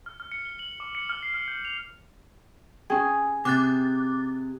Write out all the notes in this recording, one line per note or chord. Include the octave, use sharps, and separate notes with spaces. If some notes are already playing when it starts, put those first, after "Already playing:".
F6
F6
C#7
G7
F#7
D6
C#7
F6
C7
F6
G6
F7
C#4 G#4 G5
C3 D6 F#6 A6